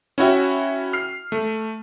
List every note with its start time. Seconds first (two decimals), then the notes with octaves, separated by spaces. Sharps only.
0.18 C#4 E4 F#4 E5 G5
0.93 F6 C7
1.32 A3